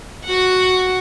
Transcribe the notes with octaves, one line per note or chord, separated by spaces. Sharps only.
F#4 F#5